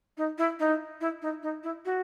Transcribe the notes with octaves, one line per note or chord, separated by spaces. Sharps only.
D#4
E4
D#4
E4
D#4
D#4
E4
F#4